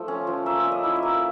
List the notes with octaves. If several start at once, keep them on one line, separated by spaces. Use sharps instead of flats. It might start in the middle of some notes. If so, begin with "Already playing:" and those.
Already playing: F3 A3
C#4
F3
A#3 E5
C#4 D5
D#5
E4
E5
A#3